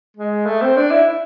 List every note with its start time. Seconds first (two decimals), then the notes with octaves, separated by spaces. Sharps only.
0.17 G#3
0.46 A3
0.62 C4
0.77 D4
0.91 E4